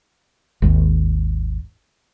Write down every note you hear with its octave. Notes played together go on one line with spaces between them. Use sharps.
G#1 D#2